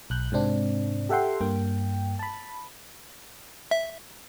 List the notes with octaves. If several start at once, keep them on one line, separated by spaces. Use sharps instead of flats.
B1 F#6 G6
G#2 C3 C4 D4
G4 A4 E5 F#5 G5 C6
G2 A#3 G5
A5 B5
E5